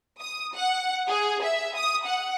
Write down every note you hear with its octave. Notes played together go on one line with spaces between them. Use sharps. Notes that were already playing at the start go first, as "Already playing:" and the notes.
D#6
F#5
G#4
E5
D#6
F#5